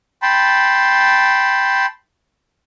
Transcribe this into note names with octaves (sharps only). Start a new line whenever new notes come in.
G5 A5 B5 C6